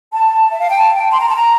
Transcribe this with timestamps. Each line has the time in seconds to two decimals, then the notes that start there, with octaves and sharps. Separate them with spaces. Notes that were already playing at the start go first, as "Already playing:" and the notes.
0.12 A5
0.50 E5
0.59 F5
0.69 G5
0.79 A5
0.95 G5
1.11 C6
1.19 A#5
1.28 A5
1.36 A#5